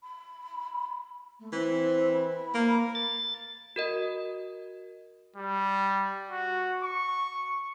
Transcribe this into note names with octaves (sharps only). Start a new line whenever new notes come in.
B5
A3
E3 C4
B5
A#3
A6
F#4 A#4 D#5
G3
F#4
C#6